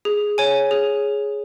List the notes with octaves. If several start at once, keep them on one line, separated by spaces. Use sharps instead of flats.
G#4
C#5 G#5
G#4